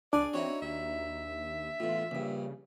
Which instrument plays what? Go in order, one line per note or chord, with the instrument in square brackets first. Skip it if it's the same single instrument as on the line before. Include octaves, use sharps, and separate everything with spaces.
[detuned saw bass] C#2 [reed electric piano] D4 [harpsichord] G#4 G#5 [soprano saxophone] D5
[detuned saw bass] C4 [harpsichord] D#4 E4 F#4 [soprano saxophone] C#5
[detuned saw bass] D#2 [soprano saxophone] E5
[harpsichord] E2 A2 [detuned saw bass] F4
[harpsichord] A#1 G2 [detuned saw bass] C#3